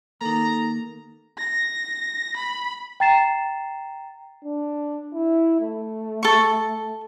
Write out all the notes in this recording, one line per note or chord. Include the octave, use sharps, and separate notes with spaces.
D#3 A#3 D#4 A4 A#5
A#6
B5
G5 A#5 A6 C7 E7
D4
E4
A3
A4 C#6